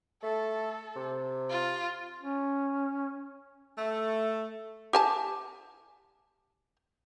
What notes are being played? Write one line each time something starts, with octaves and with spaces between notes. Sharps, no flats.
A3 A4
C3
F4
C#4
A3
G4 G#5 A5